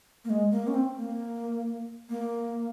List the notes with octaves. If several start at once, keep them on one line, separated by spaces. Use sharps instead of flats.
A#3
G#3
A#3
C#4
C4
A#3
A#3